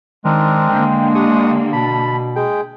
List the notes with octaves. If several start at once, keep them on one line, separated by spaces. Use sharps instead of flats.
D#3 G#3 C4 D4 A#4
D3 A#3 G5
D4 G4 C#6 D#6
B2 A5 B5
G#3 G#4 G5